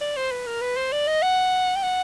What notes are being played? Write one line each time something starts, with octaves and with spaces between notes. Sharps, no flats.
D5
C5
B4
A#4
B4
C5
D5
D#5
F#5
G5
F#5